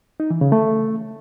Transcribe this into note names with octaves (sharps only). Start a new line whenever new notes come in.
D#4
E3
C#3
A3